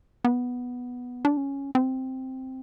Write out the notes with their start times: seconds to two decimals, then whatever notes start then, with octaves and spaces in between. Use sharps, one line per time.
0.24 B3
1.25 D4
1.37 C#4
1.75 C4